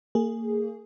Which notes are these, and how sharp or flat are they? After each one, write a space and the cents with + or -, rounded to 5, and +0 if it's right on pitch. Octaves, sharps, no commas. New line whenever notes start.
A#3 -35 G#4 +0